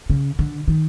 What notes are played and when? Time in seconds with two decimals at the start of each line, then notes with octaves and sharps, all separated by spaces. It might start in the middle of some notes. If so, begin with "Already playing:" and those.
0.10 C#3
0.39 D3
0.68 D#3